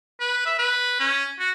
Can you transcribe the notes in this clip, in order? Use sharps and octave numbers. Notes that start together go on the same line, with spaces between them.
B4
E5
B4
C#4
F#4